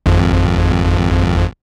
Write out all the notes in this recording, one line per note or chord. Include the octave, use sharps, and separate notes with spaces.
G#1 F2